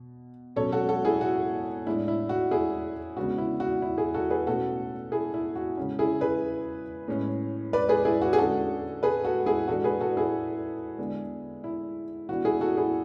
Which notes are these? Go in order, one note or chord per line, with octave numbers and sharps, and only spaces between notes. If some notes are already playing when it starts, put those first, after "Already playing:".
Already playing: B2
B2 F#3 C#4 A4 C#5
F#4 A4
F#4 A4
E4 G#4
F#4
A2 G#3 D4 E4
E4
F#4
E4 G#4
C#3 G#3 B3 D4 F#4
E4
F#4
E4
E4 G#4
F#4 A4
G#4 B4
B2 A3 C#4 F#4 A4
E4 G#4
E4
F#4
C#3 G#3 C#4
E4 G#4
G#4 B4
A2 G#3 C#4
B4 D5
G#4 B4
E4 G#4
F#4
G#4
D3 G#3 C#4 F#4 A4
G#4 B4
F#4 A4
E4 G#4
E3 G#3 D4 F#4 A4
G#4 B4
F#4 A4
E4 G#4
D3 G#3 B3 D4
E4
E3 B3 D4 F#4
E4 G#4
F#4 A4
E4 G#4